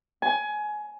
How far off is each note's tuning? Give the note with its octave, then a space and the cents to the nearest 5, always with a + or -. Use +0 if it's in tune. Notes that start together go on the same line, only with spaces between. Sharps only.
G#5 +20